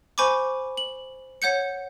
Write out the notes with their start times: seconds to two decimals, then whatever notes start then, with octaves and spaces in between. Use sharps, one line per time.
0.18 C5 G#5 B5 C#6 D6
0.77 F#7
1.42 C#5 F#5 G6 C#7